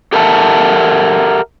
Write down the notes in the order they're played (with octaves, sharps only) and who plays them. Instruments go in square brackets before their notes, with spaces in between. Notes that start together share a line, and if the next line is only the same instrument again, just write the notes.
[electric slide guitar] G4 A4 A#4 E5 F#5 A5